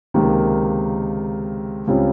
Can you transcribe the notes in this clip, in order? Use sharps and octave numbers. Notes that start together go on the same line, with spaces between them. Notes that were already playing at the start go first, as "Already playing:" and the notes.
C#2 C3 D#3 A#3
C#2 C#3 G3 C4 F4